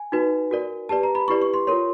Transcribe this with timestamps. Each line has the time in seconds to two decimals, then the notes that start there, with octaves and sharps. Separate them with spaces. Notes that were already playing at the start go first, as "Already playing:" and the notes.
Already playing: G#5
0.12 D#4 F#4 B4
0.51 F#4 A#4 D5
0.89 G4 B4 D5 A5
1.03 A#5
1.15 B5
1.28 E4 G4 B4 D5 C#6
1.42 C#6
1.54 C6
1.67 F4 A#4 C#5 C6